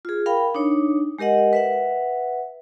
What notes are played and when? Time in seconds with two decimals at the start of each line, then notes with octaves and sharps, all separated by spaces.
0.05 F4 G#4
0.26 A#4 F5 G5 B5
0.55 D4 D#4 C#5
1.19 G#3 G4 A#4 D#5 F#5
1.53 B4 E5 F#5